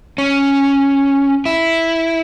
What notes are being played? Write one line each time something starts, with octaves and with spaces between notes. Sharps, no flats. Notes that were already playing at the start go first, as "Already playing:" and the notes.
C#4
E4